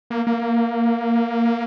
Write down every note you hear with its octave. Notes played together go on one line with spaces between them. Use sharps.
A#3
A#3